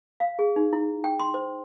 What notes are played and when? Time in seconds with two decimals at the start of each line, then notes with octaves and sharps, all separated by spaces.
0.20 F5
0.39 G#4
0.56 D#4
0.73 E4
1.04 G5
1.20 C6
1.34 C5